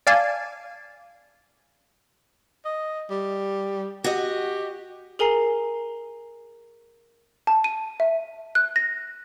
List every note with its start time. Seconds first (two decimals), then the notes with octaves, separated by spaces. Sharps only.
0.07 D5 F5 G#5 A5
2.65 D#5
3.10 G3
4.04 F#4 G4 D#5
5.19 G#4 A#4 G#5 A#5 C7
7.47 A5
7.64 D#7
8.00 E5
8.55 F#6
8.76 A#6